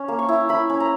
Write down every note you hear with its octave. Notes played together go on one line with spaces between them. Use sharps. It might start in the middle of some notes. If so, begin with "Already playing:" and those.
Already playing: C#4
A#3
C#6
E4
E4 B5
C#4
A#5